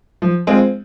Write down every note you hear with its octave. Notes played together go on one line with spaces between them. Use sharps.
F3
G#3 C4 F4